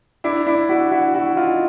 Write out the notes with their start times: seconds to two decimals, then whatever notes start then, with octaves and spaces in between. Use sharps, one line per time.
0.24 D4 E4
0.47 D4 E4
0.69 E4 F#4
0.92 E4 F#4
1.14 E4 F#4
1.37 D#4 F4